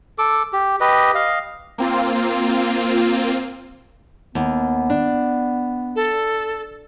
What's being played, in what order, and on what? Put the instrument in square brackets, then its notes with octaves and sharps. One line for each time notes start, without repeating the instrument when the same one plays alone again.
[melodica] A4 D6
G4
G4 B4 D#5
D#5 F5
[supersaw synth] A#3 C4 F4
[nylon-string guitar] D#2 [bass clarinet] B3
[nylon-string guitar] D4
[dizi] A4